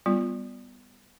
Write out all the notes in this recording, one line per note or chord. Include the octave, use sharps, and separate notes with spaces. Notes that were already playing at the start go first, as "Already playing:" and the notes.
G3 B3 F4